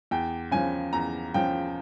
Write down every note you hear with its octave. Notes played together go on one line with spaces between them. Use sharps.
E2 G5
C#3 F3 G#5
E2 A#5
C#3 F3 G5